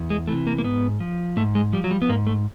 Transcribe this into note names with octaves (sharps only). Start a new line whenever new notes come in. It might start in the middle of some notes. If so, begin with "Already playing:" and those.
Already playing: E2
G#3
C3 E3 A3
A#3
A#3
G#2 B3
F3
G#2 A3
G#3
F3 G3
F#3
G3
B3
G#2 A#3
A3